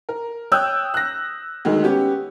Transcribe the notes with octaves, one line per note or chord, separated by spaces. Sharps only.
A#4
C#5 G5 D#6 E6 F#6 G6
F#6 A#6
D2 D#3 G#3
B3 C#4 G4